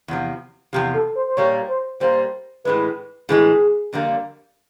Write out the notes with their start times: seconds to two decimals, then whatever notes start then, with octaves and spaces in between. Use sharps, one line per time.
0.08 E2 C3 F3
0.73 E2 C3 F3 G4
0.94 A4
1.16 C5
1.28 C5
1.37 A#2 G3 A#3 C#5
1.68 C5
2.00 A#2 G3 A#3 C5
2.64 A2 E3 G#3 B4
3.29 A2 E3 G#3 G#4
3.93 F2 D3 G3 A#3